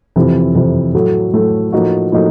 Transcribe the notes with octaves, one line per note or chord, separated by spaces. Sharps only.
F2 C3 E3
F2 C3 E3
A2 F#3 A3
A2 F#3 A3
A2 F3 A#3 D#4 F#4
A2 F3 A#3 D#4 F#4